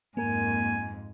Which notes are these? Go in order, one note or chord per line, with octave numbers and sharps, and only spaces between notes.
F2 G#2 A#3 A#4 G#5